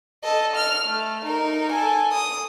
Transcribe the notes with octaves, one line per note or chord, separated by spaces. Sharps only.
A4 D#5
F6
A3
D#4 A#4
A4 G#5
D#6